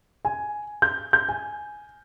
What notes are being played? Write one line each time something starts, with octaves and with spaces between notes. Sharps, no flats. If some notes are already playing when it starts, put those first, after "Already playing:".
G#5
G6
G6
G#5